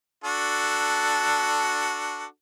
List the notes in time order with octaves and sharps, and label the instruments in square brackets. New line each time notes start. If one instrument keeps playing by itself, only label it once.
[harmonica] D4 F#4 A4